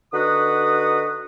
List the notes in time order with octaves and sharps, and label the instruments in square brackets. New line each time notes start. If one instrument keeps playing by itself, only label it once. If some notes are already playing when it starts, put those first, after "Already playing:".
[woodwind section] D3 D#4 F#4 B4 F#5 D#6